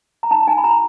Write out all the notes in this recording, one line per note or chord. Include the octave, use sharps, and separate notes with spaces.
A#5
D#4 A5
D#4 G#5
B5
F#4 A#5